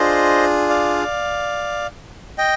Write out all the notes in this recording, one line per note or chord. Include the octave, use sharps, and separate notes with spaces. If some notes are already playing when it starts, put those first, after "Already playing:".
Already playing: D4 F4 G#4 C5 D#5
D5 F5
D#5 G5